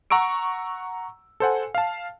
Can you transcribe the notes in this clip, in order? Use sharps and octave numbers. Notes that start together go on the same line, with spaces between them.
F#5 A#5 C#6 E6 D7
A4 C5 F#5 G#5
F5 A5